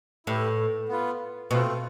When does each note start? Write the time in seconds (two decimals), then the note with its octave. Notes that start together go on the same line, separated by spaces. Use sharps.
0.26 A2 E4 G4 B4
0.89 B3 F4 B4
1.51 B2 A3 C4 F4